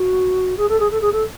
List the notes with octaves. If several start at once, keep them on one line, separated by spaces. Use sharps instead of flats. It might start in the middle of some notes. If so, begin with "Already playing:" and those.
Already playing: F#4
G#4
A4
G#4
A4
G#4
A4